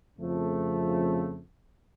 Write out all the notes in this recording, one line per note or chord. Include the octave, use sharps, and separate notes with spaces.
F2 C#3 F3 A3